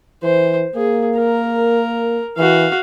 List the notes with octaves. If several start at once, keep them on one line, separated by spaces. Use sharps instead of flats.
E3 C5
A#3 G#4
A#4
E3 F#4 F5